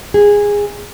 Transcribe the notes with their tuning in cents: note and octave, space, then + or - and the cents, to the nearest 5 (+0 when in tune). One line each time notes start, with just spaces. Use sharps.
G#4 -15